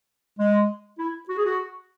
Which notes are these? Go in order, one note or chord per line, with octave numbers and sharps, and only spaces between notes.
G#3
E4
F#4
G#4
F#4